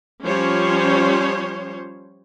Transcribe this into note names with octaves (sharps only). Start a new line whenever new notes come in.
F3 G3 C#4 C5 C#5